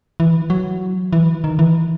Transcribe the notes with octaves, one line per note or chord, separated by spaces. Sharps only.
E3
F#3
E3
D#3
E3